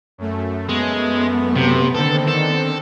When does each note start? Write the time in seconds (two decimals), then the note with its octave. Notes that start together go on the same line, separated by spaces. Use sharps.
0.18 F#2 A3
0.69 G#3 B3
1.56 C3
1.95 D3 D#3 C4 A4
2.28 A4